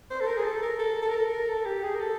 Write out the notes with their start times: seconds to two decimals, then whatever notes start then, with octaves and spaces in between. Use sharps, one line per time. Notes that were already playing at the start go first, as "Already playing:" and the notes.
0.11 C5
0.21 A4
0.27 A#4
0.37 G#4
0.44 A4
0.62 A#4
0.79 A4
1.02 A4
1.09 A#4
1.16 A4
1.25 A#4
1.49 A4
1.65 G4
1.83 G#4
1.95 A#4
2.00 A4